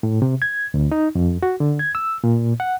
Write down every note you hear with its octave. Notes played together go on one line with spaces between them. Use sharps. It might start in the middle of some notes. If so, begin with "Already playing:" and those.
A2
C3
G#6
D2
D#4
F2
F#4
D3
G#6
E6
A#2
F#5